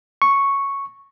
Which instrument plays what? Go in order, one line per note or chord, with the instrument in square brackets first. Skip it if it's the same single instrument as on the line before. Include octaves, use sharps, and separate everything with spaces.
[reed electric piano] C#6